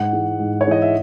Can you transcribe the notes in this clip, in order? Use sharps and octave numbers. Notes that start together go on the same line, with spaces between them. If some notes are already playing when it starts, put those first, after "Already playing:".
Already playing: G#2 F#5
E3 G#3
G#2
C#5
E3 G#3 D#5
E5